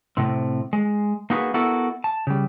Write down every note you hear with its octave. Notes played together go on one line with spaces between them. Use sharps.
A2 C3 C4
G#3
A#3 D#4 F#4 G#4 B4
B3 E4 F#4 A4 A#4
A5
C#3 G3